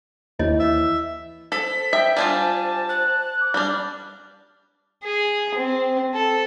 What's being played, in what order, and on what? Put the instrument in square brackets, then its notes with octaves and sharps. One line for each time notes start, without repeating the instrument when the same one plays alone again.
[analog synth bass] D#2 [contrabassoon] E3 [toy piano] C#5 D#5
[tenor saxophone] E5
[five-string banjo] A4 [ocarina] C5 [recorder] B6
[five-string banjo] E5 [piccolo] G5
[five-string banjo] G3 D4 F4 [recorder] G#5 [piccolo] A5
[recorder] F#6
[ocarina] D6
[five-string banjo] G3 D4 [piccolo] F6
[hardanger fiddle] G#4
C4
A4